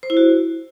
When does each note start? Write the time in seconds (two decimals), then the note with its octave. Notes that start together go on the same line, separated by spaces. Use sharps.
0.03 C5
0.10 E4
0.17 F#4